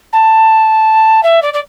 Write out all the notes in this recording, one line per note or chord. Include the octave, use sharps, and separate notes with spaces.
A5
E5
D5
D5